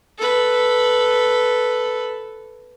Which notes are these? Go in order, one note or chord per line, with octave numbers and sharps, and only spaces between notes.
A4 B4